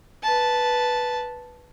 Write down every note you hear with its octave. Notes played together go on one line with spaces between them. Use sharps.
B4 A5